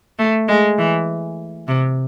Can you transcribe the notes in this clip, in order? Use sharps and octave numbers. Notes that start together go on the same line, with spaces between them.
A3
G#3
E3
C3